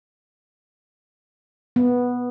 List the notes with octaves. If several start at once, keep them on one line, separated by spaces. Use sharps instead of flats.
B3